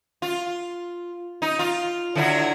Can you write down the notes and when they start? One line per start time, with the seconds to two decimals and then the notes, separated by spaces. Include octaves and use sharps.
0.22 F4
1.42 D#4
1.59 F4
2.15 D3 F#3 E4